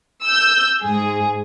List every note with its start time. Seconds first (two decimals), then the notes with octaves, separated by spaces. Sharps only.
0.25 E6 G6
0.82 G#2 G#4